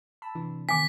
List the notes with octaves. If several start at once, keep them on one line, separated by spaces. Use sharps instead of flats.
A5 B5 E6
C3 E3 D4
D#3 B3 G#5 D6 B6